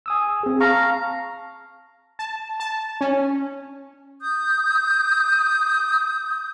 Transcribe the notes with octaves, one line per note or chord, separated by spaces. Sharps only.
G#5 D#6 E6
C4 G#4
F5 A5 A#5 C#6
A5
A5
C#4
D#6 G6